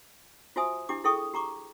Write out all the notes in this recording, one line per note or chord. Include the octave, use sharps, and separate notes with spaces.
F4 F#4 C5 E5 G#5 D#6
D4 E4 G4 D6
E4 G#4 A4 G5 C#6 D#6
G4 A#5 C#6 D6